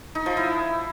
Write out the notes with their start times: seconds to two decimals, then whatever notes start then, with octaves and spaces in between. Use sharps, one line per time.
0.15 D#4
0.26 F3
0.37 E4